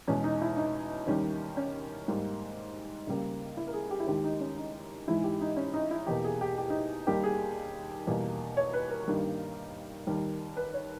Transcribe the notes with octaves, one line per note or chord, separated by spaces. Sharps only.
E2 B2 G#3 C#4
D#4
E4
D#4
D#2 D#3 G3 C#4
C#4
G#2 G3 A#3
C#2 C#3 G3 A#3
E4
A#4
G#4
G4
E4
D#2 D#3 G#3 G4
D#4
C#4
D#4
G#2 E3 G#3 E4
G4
D#4
C#4
D#4
E4
E2 B2 A#3 G4
G#4
G4
G4
D#4
D#2 D#3 G3 A#3 G4
G#4
E2 B2 G3 A#3
C#5
B4
A#4
G2 D#3 G3 A#3
D#2 D#3 G3 A#4
B4
C#5